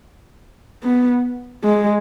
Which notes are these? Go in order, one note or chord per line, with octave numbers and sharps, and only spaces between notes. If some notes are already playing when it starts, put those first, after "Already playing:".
B3
G#3